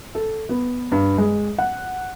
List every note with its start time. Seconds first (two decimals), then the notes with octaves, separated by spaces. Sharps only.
0.15 A4
0.49 B3
0.92 G2
1.18 G#3
1.58 F#5